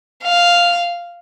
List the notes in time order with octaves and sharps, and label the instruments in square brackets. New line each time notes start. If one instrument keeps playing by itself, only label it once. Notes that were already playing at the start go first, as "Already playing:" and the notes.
[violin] F5